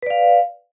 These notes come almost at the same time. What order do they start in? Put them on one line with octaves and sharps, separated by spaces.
B4 D5 F5